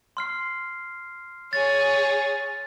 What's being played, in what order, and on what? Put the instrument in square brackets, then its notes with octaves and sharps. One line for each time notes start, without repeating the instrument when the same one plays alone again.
[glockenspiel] C6 F6 C7
[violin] G#4 C#5 [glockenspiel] A6